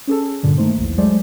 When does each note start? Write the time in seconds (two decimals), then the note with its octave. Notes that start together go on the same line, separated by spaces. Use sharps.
0.07 C#4 G#4 A4
0.43 G2 A#2 D3
0.58 D#3 A3 A#3 D#4 C5
0.77 B1 E2
0.98 F#3 G#3 A3 G#4 C5 D5